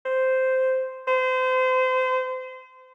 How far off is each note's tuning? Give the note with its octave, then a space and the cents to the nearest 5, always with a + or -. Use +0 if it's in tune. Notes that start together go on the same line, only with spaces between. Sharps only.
C5 -5
C5 -30